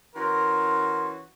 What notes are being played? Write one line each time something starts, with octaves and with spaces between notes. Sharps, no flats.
E3 C#4 F#4 A#4 C6